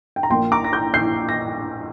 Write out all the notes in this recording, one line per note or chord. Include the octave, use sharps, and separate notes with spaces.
G5
A#5
A#1 A#2 A#3 G5 C6
A#5 D6
A#6
D6 G6
G6 C7
A#6